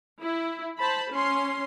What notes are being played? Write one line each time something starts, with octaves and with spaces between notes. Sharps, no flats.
E4
C5 A5 B5
C#4 C6